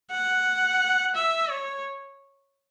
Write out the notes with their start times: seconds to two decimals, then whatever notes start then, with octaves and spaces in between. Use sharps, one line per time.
0.11 F#5
1.15 E5
1.50 C#5